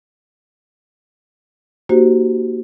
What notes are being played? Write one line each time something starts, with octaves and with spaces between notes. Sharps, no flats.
A#3 D#4 F#4 G4 C5